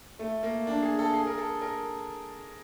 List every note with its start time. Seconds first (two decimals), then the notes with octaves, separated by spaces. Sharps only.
0.19 A3
0.43 A#3
0.67 D4
0.82 G#4
0.99 A4
1.14 G#4
1.27 A#4
1.38 A4
1.62 A#4